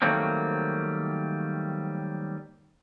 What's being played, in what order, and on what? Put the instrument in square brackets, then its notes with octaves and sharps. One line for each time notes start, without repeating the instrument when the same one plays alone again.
[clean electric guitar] D#3 F#3 G3 A3 A#3 C4